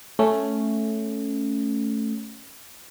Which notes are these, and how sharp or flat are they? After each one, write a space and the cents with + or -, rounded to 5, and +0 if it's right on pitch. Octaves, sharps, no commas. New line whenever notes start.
A3 +0 C#4 +0